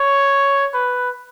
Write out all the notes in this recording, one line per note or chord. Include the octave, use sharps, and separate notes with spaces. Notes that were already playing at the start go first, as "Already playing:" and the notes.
Already playing: C#5
B4